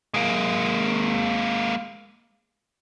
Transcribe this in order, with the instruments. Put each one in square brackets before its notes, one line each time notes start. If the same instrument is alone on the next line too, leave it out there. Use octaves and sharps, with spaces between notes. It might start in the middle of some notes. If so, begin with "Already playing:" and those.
[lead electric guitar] G#3 A#3